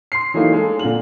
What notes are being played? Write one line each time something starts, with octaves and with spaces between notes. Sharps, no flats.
C6 C7
E3 F#3 A3 A#3 D#4
G#3 A4
A#2 D3 F#7